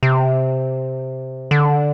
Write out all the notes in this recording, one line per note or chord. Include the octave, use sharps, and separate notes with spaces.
C3
D3